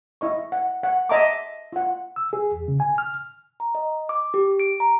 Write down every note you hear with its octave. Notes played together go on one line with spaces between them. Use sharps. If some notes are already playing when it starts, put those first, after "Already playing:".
E4 D#5 C#6
F#5
F#5
D#5 E5 A5 A#5 C6 D6
F4 F#5
E6
G#4
E2
C#3
G#5
F6
A#5
D#5
D6
G4
D7
A#5